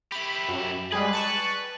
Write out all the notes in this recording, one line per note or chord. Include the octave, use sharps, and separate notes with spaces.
E4 G4 B5
F#2
G3 G#3 G#4 B4
A5 C#6 F#6